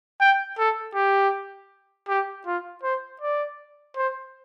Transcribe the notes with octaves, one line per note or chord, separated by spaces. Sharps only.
G5
A4
G4
G4
F4
C5
D5
C5